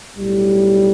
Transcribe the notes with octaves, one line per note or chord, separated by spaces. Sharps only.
B1 A2 G3